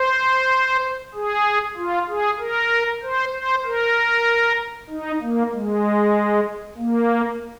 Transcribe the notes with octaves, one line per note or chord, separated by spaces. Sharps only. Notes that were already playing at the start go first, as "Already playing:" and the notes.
Already playing: C5
G#4
F4
G#4
A#4
C5
C5
A#4
D#4
A#3
G#3
A#3